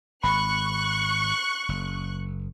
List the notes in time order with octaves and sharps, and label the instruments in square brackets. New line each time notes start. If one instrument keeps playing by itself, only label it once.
[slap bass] G#1 [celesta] B5 [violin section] C#6 F#6
[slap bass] F#1